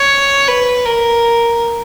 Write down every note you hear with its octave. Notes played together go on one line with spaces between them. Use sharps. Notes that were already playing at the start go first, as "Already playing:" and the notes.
Already playing: C#5
B4
A#4